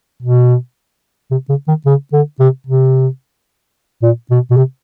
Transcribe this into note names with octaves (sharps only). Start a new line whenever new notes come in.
B2
C3
C#3
D#3
C#3
D3
C3
C3
A#2
B2
B2
C3